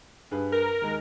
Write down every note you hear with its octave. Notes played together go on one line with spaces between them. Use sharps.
G2 G#4 B4
A#4
D#2 G#3